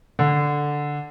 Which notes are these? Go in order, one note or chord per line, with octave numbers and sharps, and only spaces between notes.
D3